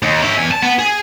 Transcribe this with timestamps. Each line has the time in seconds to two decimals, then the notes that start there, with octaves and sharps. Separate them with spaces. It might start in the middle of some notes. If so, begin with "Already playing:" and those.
0.02 D#2
0.22 C#4 E5
0.38 E2 G#5
0.51 A5
0.63 B3
0.79 G#4